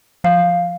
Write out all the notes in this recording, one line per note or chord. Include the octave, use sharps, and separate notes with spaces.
F3 F5